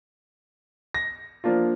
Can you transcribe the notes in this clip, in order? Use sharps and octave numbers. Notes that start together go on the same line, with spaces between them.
A#6
F3 A#3 D4 F4